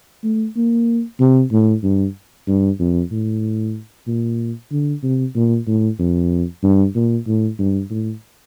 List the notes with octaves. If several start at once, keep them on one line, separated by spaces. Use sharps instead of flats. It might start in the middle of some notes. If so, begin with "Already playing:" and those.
A3
A#3
C3
A2
G2
G2
F2
A2
A#2
D3
C3
A#2
A2
F2
G2
A#2
A2
G2
A2